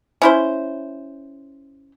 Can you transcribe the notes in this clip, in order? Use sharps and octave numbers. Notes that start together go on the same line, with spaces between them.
C#4 E4 C5